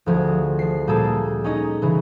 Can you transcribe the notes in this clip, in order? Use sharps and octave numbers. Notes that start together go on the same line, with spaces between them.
D2 F3 G#4
F3 C7
A#2 G3 A#3 G#4 A4
C#4 D#4 D#5
C#3 E3